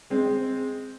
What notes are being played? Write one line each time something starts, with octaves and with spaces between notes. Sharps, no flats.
G#3 C4